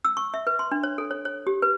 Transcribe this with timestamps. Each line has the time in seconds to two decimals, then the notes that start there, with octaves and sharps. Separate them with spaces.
0.05 E6
0.17 C#6
0.34 E5
0.47 B4
0.59 C6
0.71 D4
0.83 C#5
0.98 A4
1.11 C#5
1.25 C#5
1.47 G4
1.62 B4